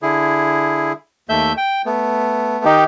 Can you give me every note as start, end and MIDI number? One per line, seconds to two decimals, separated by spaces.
0.02 0.93 50
0.02 0.93 64
0.02 0.93 68
1.29 1.53 39
1.29 1.53 57
1.29 1.53 76
1.29 1.53 91
1.57 1.82 79
1.86 2.65 57
1.86 2.65 59
2.65 2.84 51
2.65 2.84 63
2.65 2.84 67